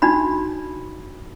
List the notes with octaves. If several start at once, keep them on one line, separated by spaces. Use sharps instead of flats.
D4 D#4 F#4 B5